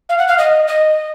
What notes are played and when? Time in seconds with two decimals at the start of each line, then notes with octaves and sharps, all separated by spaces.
0.09 F5
0.18 F#5
0.28 F5
0.38 D#5
0.68 D#5